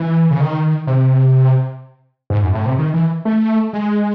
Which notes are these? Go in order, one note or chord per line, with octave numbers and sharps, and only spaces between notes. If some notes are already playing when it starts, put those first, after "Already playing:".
Already playing: E3
C#3
D#3
C3
G#2
F#2
A2
C3
D#3
E3
A3
G#3